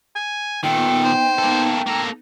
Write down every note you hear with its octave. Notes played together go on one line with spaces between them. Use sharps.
G#5
A#2 D#3 B3 D#4 A4 G5
C5
A#3 A4
A#3 A4 A#5